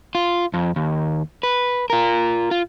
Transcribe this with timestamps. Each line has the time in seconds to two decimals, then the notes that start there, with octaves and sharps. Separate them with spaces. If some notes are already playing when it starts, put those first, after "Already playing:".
0.15 F4
0.54 F2
0.76 D#2
1.43 B4
1.90 F4 A#4
2.51 F4